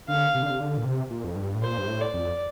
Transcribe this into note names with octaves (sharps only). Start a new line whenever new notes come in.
D3 F5
C3
D3
C3
D3
A#2
C3
A#2
F2
G2
A2
A#2 C5
G2
A2
D5
F2